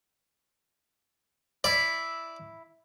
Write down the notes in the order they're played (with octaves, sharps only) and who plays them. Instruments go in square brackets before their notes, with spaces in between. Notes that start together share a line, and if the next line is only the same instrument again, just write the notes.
[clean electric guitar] E4 [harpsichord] D5